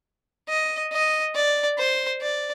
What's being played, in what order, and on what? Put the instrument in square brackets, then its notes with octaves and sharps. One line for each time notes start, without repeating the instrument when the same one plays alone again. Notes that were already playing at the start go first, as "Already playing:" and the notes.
[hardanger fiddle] D#5
D#5
D5
C5
D5